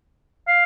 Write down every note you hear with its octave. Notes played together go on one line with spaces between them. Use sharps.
F5